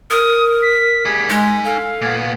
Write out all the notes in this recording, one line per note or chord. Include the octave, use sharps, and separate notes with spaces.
A#4 D#6
B6
G3 G#4
G#3 D#4 G#5
A4 F5
A#2 B3